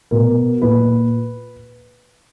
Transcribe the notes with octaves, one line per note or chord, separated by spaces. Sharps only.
B2 A#4
A#2 B4